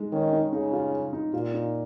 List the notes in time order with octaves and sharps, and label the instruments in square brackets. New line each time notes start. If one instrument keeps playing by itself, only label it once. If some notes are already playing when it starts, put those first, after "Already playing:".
Already playing: [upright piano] G#3 D#4
[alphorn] D#3 [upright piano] C#4
[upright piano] D#4
[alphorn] C#3 [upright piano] D#4
[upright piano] F4
D#4
[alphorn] A#2 [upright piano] F4
[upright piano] D#4